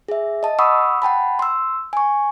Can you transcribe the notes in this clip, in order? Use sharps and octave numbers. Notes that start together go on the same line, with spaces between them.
G#4 E5
D#5 A5
F#5 B5 C#6 D#6 E6
F#5 G5 A5 B5
C6 E6
G#5 C#6